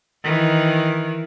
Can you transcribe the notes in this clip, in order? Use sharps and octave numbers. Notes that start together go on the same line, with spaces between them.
D#3 E3